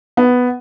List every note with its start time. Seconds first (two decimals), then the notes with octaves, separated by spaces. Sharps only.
0.17 B3